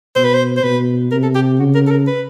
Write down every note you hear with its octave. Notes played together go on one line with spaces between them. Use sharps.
B2 C5
B4
C5
C5
B2 B4
C3 A#4
A4
G4
C#3 F#4
A#4
A4
A#4
B4